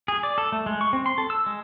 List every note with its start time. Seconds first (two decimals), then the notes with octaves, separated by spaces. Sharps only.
0.08 G#4
0.23 D5
0.38 A4
0.52 A3
0.66 G#3
0.81 C#6
0.93 C4
1.06 C6
1.18 A4
1.30 E6
1.46 G#3